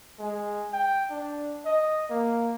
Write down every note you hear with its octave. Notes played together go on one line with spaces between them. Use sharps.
G#3
G5
D4
D#5
A#3